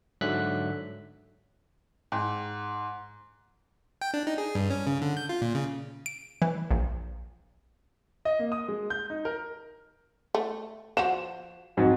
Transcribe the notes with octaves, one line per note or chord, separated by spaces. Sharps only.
G#2 D3 F#3 E5 F#6 B6
G#2
G5
D4
D#4
G#4
G2
C#4
C#3
D3
G6
F4
A#2
C#3
D7
E3
A#1
D#5
A#3
D#6
G#3
G6
D#4
A#4
A3
F3 F#4 E7
F2 G#2 F#3